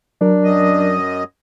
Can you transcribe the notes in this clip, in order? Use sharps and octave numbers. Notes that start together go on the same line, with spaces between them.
F#3 D4 A#4
F#2 D#5